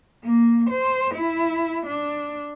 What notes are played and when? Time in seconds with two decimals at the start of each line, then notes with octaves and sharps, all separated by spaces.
0.24 A#3
0.70 C5
1.15 E4
1.86 D4